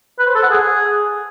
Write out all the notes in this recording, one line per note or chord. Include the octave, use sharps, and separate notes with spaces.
B4
C5
A4
F#5
G#4